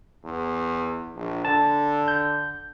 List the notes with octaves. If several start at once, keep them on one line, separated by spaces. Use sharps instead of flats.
E2
A#1
D3 A5
G6